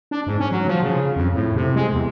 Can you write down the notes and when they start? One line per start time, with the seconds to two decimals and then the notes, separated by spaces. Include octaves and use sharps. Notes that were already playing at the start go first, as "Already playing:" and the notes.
0.11 D4
0.27 G#2
0.40 C#4
0.51 F#3
0.68 F3
0.82 C#3
1.16 F2
1.35 A2
1.56 C3
1.76 G#3
1.93 E2